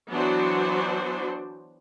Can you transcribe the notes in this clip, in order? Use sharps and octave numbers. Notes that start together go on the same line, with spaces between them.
E3 F#3 B3 D4 F#4 C5